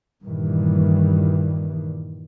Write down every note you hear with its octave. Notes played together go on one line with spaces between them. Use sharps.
G2 A#2 D#3 E3 G3